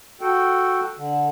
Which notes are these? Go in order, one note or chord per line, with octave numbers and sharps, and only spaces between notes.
F#4 A4 G5
D3